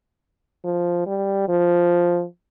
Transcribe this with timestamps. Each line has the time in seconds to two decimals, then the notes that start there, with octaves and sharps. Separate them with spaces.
0.64 F3
1.07 G3
1.49 F3